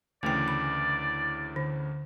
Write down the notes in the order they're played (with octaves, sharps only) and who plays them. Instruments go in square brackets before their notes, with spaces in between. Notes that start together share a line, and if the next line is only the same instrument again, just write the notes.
[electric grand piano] D2 C#3 E3 [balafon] A3 G5 [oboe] D5
[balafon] B5
D3